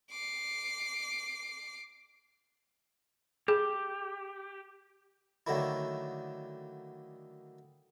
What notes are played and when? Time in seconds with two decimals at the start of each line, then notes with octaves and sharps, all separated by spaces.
0.10 D6 C7
3.48 G4 G#4
5.47 D3 D#3 F#3 A3 A#3 E4